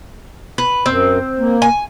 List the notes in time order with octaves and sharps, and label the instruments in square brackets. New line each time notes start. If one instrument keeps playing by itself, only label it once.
[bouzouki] B4
[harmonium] F#2 [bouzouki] C4
[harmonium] A#3
[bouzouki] G#5